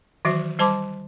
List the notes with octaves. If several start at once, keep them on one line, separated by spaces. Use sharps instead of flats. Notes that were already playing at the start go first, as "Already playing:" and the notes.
D#3 E3 F#3 F#4 E5
G3 C5 A5 C6 D6